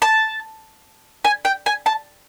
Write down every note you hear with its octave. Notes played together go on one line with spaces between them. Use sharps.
A5
G#5
G5
G#5
A5